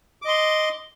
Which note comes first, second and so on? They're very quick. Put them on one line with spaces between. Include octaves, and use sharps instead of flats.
D6 D#5 C6